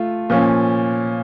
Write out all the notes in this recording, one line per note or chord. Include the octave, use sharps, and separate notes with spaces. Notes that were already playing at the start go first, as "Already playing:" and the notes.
Already playing: A3 F4
A#2 F3 C#4